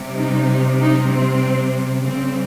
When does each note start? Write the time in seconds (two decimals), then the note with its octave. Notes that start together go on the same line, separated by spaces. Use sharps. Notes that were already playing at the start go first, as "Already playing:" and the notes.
Already playing: C3 G3
0.16 D#4
0.80 D#4
1.11 C4
2.04 C#3 G3 C4